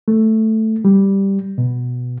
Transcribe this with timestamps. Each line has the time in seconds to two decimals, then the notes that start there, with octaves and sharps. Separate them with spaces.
0.08 A3
0.85 G3
1.58 B2